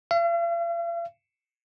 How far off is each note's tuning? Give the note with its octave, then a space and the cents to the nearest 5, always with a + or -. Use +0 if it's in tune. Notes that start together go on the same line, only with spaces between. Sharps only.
F5 -45